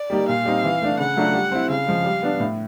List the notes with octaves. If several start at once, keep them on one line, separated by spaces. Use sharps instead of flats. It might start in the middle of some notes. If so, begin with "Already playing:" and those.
Already playing: D5
G3 A#3 D#4 G4
A#2 F5
G3 C4 D#4
E3
A3 D4
C#3 F#5
F#3 A3 D4 F4
G3
C4 E4
C#3 F5
F3 G#3
G3
B3 D4
A2